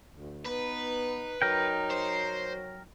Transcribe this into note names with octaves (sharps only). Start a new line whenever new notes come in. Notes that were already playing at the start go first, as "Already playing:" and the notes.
D2
B3 D#4 B4
F#3 D#4 A#4 G5
C5